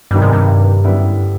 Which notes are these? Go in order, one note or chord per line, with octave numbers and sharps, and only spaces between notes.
G2 C3 D#3 G3 B3
G#2
G2
F#2 D3 G3 B3 E4